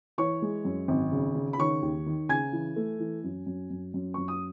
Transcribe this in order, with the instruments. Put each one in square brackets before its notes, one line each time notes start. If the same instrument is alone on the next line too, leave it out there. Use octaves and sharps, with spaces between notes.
[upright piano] E3 C#5 C#6
G#3
F#2
G#1
C#3
C#3
B5
D#3 C#5 C#6
D#2
D#3
C#3 G#5 G#6
E3
A3
E3
F#2
F#2
F#2
F#2
F#2 C#6
D#6